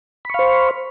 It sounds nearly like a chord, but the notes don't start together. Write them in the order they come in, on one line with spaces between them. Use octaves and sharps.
B5 C#6 F5 C5